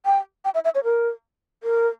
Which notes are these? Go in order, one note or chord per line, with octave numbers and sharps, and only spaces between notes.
G5
G5
E5
E5
C#5
A#4
A#4